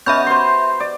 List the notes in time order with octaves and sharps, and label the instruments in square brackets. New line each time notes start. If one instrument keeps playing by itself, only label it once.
[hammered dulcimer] B2 C#4 [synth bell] E5 B5 G6
[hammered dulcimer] C5 C6
D5